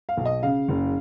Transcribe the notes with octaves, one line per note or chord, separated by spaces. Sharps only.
F5
B1
D#5
C#3 F5
F#1